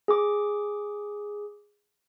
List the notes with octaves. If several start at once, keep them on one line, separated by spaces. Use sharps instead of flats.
G#4 D6